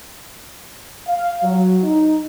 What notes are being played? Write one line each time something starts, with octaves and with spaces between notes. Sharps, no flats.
F5
F#3
D#4